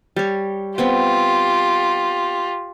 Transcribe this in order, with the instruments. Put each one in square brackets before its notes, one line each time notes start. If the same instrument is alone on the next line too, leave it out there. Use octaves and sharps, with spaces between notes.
[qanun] G3 C#5
[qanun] B3 C4 G5 [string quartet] F4 G4